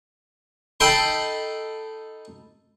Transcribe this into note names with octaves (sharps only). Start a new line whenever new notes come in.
D#4 A4 G5 B5 C6